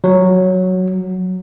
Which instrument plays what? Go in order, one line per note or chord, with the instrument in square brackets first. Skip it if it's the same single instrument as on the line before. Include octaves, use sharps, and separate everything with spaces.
[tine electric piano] F#3